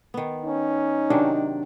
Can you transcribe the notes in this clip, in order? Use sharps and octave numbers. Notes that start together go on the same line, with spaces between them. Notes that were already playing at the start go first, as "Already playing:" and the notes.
D#3 B3
C#4 D#4
C3 D#3 F#3 D4